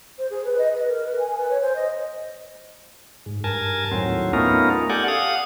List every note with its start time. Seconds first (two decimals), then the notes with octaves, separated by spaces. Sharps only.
0.18 C5
0.30 G#4
0.45 B4
0.58 D#5
0.75 B4
0.88 A#4
1.06 B4
1.19 G#5
1.37 B4
1.50 C#5
1.61 C5
1.76 D#5
3.26 G#2
3.44 G2 A#4 G#5 A5
3.92 D#2 A2 F#3 C4
4.33 A3 B3 C#4 D#4 F4 A#4
4.90 G4 A4 D5 F#5 G#5
5.08 F5 F#5 D#6